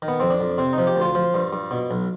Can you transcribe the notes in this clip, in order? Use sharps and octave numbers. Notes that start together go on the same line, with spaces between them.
D#3
B3
F2 C4
D4
F2
C3 C4
D#4
F3
G4
D2
F4
F3
G2
G2
B2
B1